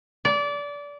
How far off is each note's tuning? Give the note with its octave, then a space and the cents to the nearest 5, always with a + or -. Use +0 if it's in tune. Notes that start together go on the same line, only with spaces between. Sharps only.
D5 -25